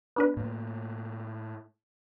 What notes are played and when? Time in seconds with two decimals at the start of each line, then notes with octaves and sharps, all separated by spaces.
0.16 B3 D4 B4
0.37 A2 A#3